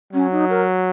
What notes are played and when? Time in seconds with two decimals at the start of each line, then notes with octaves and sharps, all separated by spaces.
0.13 F#3 C#4
0.31 D#4
0.50 A#4